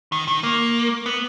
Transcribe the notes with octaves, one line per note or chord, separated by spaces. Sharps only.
D#3
D#3
A#3
B3